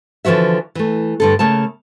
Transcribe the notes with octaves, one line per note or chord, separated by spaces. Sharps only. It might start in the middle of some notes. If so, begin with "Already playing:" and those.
D3 E3 F3 F#4 E5
E3 A3
G2 D3 A4
C#3 A3 A#3 A5